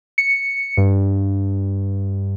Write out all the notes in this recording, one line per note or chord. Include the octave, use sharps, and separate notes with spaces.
C#7
G2